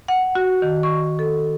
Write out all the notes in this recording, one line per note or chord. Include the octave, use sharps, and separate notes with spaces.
F#5
F#4
D#3
C#6
A4